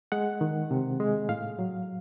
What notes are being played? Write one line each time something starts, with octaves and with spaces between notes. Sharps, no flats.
G#3 F#5
D#3
C3
G#3
A2 F5
F#3